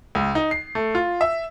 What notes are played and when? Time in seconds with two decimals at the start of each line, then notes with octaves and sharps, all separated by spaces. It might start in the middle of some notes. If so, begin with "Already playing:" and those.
0.15 C#2
0.35 D#4
0.51 C7
0.75 A3
0.95 F4
1.21 E5